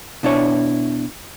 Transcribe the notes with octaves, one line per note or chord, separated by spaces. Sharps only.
B2 D4 E4 C#5